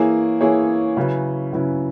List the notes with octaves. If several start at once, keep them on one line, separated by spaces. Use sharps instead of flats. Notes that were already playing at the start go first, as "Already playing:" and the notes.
Already playing: E3 A#3 E4 G#4 C#5
E3 A#3 E4 G#4 C#5
C#3 F#3 C#4 E4 B4
C#3 F#3 C#4 E4 B4